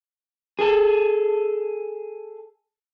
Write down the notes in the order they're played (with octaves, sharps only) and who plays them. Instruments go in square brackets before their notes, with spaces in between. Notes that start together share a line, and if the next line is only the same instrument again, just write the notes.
[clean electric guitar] G#4 A4